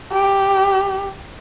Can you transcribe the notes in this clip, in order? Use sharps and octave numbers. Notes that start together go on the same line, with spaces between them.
G4